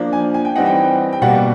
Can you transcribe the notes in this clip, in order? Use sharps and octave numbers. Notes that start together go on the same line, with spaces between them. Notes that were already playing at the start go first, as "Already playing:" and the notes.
Already playing: F3 A#3 D4
G#5
G#5
G5
E3 G3 C4 D#4 F#5
G5
G5
B2 G3 A#3 F#5